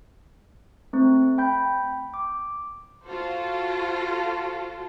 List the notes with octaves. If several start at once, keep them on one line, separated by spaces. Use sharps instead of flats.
A3 C4
G5 B5 G6
D6
F4 F#4 A4 C5